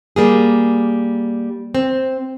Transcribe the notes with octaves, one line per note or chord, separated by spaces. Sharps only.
G3 A#3 G#4
C4